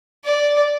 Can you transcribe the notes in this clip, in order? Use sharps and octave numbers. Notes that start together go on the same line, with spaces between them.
D5